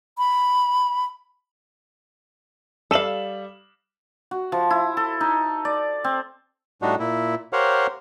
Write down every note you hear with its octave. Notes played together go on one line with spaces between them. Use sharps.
B5
G3 A4 F5 E7 F#7
F#4
F3
E4
A4
D#4
D5
C4
A2 G3 D4 D#4 F#4
A#2 E4
G4 A#4 C5 C#5 F5 F#5